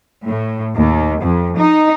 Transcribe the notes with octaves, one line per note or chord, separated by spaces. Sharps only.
A2
D#2
F2
D#4